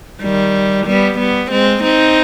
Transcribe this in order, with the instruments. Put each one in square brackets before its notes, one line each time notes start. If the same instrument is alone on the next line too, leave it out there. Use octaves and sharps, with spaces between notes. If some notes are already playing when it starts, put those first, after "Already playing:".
[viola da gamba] D#3 G3
G3 B3
G3 B3
G#3 C4
C4 D#4